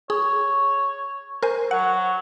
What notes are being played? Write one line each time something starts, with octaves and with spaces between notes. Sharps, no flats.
G#4 C#5
A#4 C5 G#5
F#3 F#5